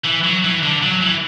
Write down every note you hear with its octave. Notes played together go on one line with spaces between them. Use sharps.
E3
F#3
E3
D3
F#3
E3